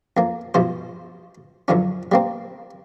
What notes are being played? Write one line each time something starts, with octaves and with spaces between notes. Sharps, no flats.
F2 A#3
G2 B2 F3 C5
F#2 D3 F3 C#4
G3 A#3 C4